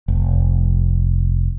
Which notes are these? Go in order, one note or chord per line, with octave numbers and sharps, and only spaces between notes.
F1